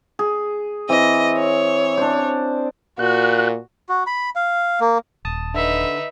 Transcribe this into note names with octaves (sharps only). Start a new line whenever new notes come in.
G#4
E3 C4 D#5
C#5
D4 C5
A#2 F#4 F#6
F#4
B5
F5
A#3
D#1 A5 D#6
D3 D#4 B4 E5